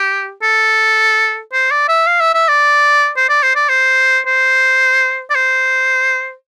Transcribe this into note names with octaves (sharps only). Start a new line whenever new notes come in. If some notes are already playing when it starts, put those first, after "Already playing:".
Already playing: G4
A4
C5
D5
E5
F5
E5
E5
D5
C5
D5
C5
D5
C5
C5
D5
C5